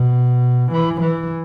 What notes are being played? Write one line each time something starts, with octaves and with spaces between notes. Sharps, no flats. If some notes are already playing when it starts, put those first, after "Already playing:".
Already playing: B2
E3
E3